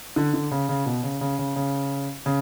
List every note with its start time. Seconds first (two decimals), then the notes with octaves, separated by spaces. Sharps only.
0.16 D3
0.34 D3
0.51 C#3
0.69 C#3
0.86 B2
1.03 C#3
1.21 C#3
1.39 C#3
1.56 C#3
2.26 C#3